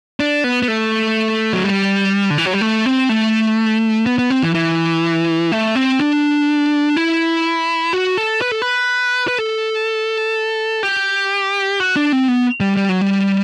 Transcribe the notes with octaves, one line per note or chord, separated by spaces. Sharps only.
D4
B3
B3
A3
F#3
G3
D3
E3
F#3
G3
A3
C4
A3
B3
B3
C4
E3
E3
A3
C4
D4
E4
F#4
A4
B4
A4
B4
B4
A4
G4
F#4
D4
C4
B3
G3
G3
F#3
G3